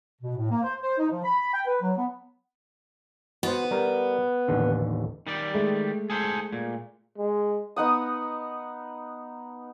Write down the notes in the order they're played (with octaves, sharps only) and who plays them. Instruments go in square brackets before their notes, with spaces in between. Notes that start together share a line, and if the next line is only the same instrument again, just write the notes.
[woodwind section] B2
A2
A#3
C5
C5
D#4
F3
B5
G5
B4
F#3
B3
[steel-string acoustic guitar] B3 [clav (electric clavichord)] F#4 C5
[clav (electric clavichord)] G3 A#4
A1 D#2 D3
[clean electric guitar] D#3 G3 D5
[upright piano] G#3 A3
[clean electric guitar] G#4 A4 C5
A#2
[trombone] G#3
[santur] B3 D#4 F#5 D#6